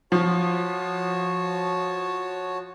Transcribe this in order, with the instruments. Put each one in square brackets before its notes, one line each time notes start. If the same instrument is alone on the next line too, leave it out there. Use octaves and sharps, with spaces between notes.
[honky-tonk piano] F3 [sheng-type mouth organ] F#4 C#5 A5